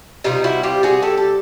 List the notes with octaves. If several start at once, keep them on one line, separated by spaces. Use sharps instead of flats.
C3 D#3 G3 D#4 F4
E4 F#4
F4 G4
F#4 G#4
G4 A4
A4